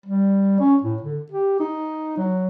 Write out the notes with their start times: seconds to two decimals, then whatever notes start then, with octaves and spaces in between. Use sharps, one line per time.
0.06 G3
0.60 C#4
0.83 A2
1.02 D3
1.32 G4
1.60 D#4
2.18 F#3